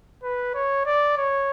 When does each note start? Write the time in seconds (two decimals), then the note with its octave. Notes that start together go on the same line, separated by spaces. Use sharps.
0.23 B4
0.54 C#5
0.86 D5
1.17 C#5